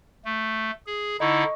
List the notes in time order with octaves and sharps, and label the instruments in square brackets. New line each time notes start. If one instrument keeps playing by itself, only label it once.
[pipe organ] A3
G#4
[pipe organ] D3 D#4 E4 [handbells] D#5 C#6